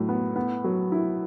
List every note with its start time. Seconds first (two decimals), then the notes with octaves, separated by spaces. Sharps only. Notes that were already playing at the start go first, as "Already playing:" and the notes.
Already playing: A2 F#3
0.09 B3
0.36 B3
0.64 F#3
0.92 E4